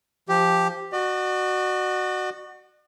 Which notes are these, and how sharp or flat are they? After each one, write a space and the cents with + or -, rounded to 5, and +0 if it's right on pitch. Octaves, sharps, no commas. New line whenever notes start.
F3 -10 G4 +0
F#4 +0 D5 +45